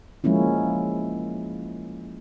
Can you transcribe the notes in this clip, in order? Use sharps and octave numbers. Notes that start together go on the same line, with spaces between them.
F3 G#3 A#3 C#4 E4